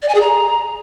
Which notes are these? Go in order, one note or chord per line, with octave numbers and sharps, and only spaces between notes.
D5
G#5
G#4
A#5